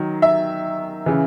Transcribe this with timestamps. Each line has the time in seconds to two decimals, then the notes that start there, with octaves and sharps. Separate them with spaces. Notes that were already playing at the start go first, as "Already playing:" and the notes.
Already playing: D#3 F#3
0.22 E5
1.06 C#3 E3